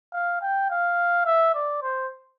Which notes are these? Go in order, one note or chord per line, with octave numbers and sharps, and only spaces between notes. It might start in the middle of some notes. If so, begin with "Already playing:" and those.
F5
G5
F5
E5
D5
C5